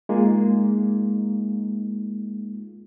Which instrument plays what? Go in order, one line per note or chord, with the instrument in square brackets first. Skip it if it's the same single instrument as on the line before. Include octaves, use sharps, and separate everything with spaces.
[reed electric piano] G#3 A#3 D#4 F4 G#4